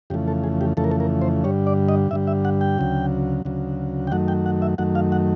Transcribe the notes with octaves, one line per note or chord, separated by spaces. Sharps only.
F2 C#3 E3 A3 G4
A4
G#4
G4
F2 C#3 E3 A3 A4
A#4
A4
A#4
C5
G2 D3 G3 C#5
D5
D#5
G2 D3 G3 E5
E5
F#5
G5
D2 C#3 F#3
D2 C#3 F#3
G5
F#2 D#3 F#3 A3 F#5
G5
F#5
E5
F#2 D#3 F#3 A3 F#5
F5
F#5